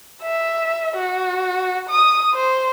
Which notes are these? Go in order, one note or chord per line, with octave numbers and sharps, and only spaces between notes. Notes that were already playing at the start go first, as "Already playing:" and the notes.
E5
F#4
D#6
C5